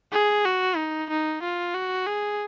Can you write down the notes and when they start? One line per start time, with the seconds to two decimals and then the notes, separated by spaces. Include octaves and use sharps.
0.13 G#4
0.45 F#4
0.77 D#4
1.10 D#4
1.42 F4
1.75 F#4
2.06 G#4